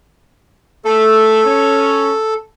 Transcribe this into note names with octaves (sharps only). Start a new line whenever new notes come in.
A3 A4
C#4